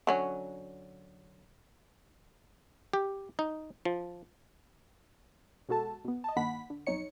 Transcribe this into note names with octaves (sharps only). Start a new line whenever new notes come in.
D3 F#3 C#4
G4
D#4
F3
B2 G#3 F#4 A4 A5
B2 B3
D#5 A5
G2 D#3 A#3 F#5 B5 B6
D3
B1 F2 D#4 C#5 C#7